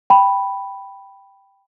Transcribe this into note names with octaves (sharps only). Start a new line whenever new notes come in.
G5 B5